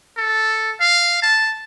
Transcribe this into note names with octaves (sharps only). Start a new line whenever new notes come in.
A4
F5
A5